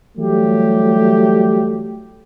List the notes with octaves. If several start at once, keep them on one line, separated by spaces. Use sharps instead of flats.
E3 F#3 G3 A3 G4